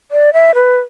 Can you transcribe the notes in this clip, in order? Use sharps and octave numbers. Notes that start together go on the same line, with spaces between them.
D5
E5
B4